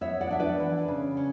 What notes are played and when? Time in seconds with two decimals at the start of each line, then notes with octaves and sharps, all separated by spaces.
0.01 B3 C#5 E5
0.21 D5 F#5
0.30 D4 E5
0.40 B4 D5
0.60 E3
0.88 C#3
1.17 C#4